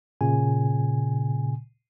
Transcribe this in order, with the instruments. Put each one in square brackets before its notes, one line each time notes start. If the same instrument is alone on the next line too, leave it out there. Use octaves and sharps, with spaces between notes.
[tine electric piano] A#2 C#3 G#5